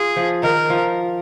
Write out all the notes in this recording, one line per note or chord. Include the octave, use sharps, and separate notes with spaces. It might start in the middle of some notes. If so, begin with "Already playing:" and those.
Already playing: F4 G#4
F3
D#3 A#4
F3